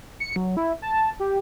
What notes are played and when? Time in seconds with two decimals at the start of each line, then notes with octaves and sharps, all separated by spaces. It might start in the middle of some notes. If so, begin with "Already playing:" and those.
0.20 C#7
0.36 F#3
0.57 E4
0.82 A5
1.20 G4